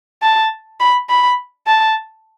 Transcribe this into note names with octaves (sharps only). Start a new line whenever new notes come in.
A5
B5
B5
A5